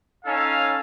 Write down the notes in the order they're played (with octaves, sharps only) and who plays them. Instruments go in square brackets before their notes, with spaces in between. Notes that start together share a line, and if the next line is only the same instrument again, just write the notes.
[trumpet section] C#4 D#4 A4 [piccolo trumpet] F5